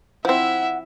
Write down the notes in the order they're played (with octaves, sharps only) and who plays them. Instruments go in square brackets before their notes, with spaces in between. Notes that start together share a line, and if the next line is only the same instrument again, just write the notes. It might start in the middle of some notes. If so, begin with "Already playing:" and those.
[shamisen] F3 C4 [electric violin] E4 E5 [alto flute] F#5